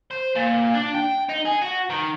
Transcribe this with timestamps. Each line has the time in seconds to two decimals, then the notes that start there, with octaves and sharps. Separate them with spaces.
0.11 C5
0.35 A#2
0.74 D4
0.94 G5
1.29 D#4
1.45 G#4
1.62 F#4
1.90 D#3